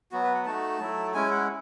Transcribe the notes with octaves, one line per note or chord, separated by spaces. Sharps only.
F#3 B3 F#4
B4
F#5
A3 D#4 F#4 A5
F#3 A3 E4
G#3 C#4 E4 G#5
F#5